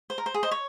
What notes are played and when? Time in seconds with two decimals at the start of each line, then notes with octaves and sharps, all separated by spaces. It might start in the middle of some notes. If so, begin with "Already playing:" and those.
0.10 C5
0.18 A#4
0.26 C5
0.34 G#4
0.43 C5 D#5
0.51 C#5